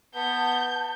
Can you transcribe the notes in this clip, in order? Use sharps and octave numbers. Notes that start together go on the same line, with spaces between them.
B3 A5 G6